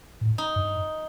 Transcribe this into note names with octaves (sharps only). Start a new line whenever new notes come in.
A2
D#4
G2